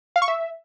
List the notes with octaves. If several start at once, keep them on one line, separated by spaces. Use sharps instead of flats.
F5
C#6
E5